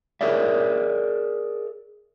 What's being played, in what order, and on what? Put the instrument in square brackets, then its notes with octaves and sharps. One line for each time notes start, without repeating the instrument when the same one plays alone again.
[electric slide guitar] G#4 A#4 C#5 D5 E5